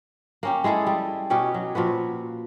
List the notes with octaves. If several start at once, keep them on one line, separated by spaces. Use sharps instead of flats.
A#3 C#4 G4
G#3 E4 G#4 A4
G3
B2 C#4 G4 C#5
F#3
A#2 F3 F#4 B4